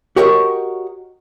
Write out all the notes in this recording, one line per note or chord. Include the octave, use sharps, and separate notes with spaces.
F#4 G4 A#4 C#5 D#5 F#5